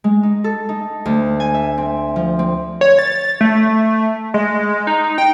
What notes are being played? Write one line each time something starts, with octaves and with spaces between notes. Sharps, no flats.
G#3
D#4
A4
D#4
D2
G#5
E5
C4
F3
C4
C#5
A6
A3
G#3
D#4
G5